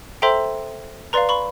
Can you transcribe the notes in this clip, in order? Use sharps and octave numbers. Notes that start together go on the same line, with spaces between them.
A4 C5 E5 G5 A#5 C6
B4 D5 F5 A#5 C6
B5 C#6